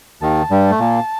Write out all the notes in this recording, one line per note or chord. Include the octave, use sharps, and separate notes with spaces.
D#2 D#3 A5
G2 G3
A3
A#2 A#3